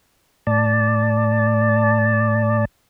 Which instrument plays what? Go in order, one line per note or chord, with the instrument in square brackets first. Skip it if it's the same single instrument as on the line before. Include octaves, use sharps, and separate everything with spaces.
[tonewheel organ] A2 D5 A5